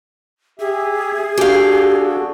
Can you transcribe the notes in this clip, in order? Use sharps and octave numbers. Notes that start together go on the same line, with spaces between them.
G4 G#4 E5
D4 F#4 G4 A4 F5